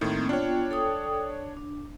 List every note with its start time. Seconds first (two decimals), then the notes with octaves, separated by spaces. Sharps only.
0.01 A2 D#3 A#3 C4
0.29 B3 D4 F4 C#5 G5
0.71 A4 G5 D#6
1.57 D4